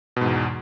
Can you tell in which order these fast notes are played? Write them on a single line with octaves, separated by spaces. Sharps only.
B2 G#2 E2